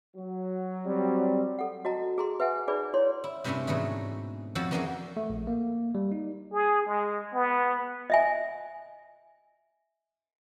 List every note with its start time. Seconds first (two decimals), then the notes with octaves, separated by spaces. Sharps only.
0.17 F#3
0.86 G3 C4
1.59 A4 F#5
1.85 F#4 D#5 A5 A#5
2.18 G#4 A#5 C6
2.40 B4 E5 F#5 G#5
2.68 D#4 G#4 B4 D5 B5
2.94 E4 C#5 C6
3.24 E4
3.44 G2 C3 A3 C#4 D4 E4
3.67 G#2 B2 E3 A3 G#4
4.55 F2 F3 F#4 A4 C#5 A5
4.71 E3 A#3 C#4 D4 F#4 G#4
5.17 A3
5.30 A#1
5.47 A#3
5.95 G3
6.12 D#4
6.53 G#4
6.87 G#3
7.34 B3
8.10 D#5 E5 G#5